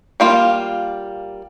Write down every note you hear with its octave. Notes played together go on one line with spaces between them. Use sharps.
G3 A#3 F4